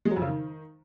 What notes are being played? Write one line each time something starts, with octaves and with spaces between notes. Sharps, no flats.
G#3
F#3
F2
C#3
D#3